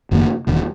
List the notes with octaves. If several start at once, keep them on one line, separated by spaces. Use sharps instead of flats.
F#1 F#2 D#3 A#3
E1 E2 D#3